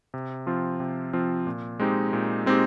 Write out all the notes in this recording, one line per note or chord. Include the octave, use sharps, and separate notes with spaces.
C3
F3 C4 F4
C3
F3 C4 F4
A#2
G#3 C4 D#4 G4
A#2
G#3 C4 D#4 G4